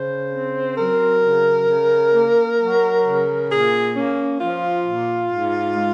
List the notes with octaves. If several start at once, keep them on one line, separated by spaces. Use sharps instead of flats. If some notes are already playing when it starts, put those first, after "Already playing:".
Already playing: C#3 C5
C4
F#3 A#4
C#3
C#3
A#3
F#3
C#3
A#2 G#4
A#3 C#4
F3 F4
A#2
G#2
G#3